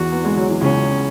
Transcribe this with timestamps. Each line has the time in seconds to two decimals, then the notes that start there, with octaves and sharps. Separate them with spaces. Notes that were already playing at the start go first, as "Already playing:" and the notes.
Already playing: E2 E3 F#4
0.12 B3
0.25 G#3
0.37 F#3
0.50 E3
0.61 C#2 C#3 C#4